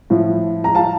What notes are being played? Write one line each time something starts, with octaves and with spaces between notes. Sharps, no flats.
A2 F3
A#5
F5 A5